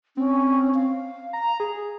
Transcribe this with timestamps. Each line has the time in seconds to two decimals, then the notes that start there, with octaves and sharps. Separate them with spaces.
0.17 C4 C#4
0.75 F5
1.33 A#5
1.60 G#4